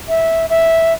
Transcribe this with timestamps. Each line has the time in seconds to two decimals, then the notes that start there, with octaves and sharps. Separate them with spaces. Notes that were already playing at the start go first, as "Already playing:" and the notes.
0.09 E5
0.50 E5